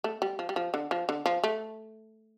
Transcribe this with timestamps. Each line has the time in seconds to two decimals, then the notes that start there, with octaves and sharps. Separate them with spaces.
0.04 A3
0.22 G3
0.39 F3
0.49 G3
0.56 F3
0.74 D3
0.91 F3
1.09 D3
1.26 F3
1.44 A3